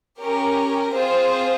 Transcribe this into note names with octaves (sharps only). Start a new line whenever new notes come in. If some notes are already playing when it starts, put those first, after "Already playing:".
C#4 G4 A#4
C4 F4 G#4 C5